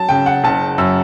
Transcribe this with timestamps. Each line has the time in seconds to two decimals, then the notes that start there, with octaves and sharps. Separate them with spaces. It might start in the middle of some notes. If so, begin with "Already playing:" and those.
Already playing: F#3 A5
0.09 C#3 G5
0.26 F#5
0.44 F#1 A5
0.78 F#2 E6